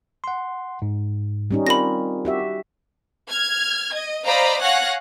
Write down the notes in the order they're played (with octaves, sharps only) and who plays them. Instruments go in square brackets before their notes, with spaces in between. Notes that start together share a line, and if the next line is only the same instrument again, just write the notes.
[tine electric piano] F#5 C6
G#2
[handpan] G3 C#4 D#4
[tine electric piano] C4 F4 A#4 [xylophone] B5 A#6
[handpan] F#4 G4 E5
[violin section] F6 G#6
D#5
C5 D5 D#5 F5 A#5 B5
C#5 F5 F#5 G#5 F#6 A#6